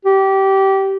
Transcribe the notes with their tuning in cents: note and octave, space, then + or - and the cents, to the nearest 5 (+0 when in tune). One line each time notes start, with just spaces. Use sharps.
G4 -20